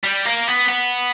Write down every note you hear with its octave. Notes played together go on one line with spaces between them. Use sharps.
G3
A#3
B3
B3